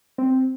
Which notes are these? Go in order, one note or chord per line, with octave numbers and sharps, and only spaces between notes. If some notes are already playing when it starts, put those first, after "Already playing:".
C4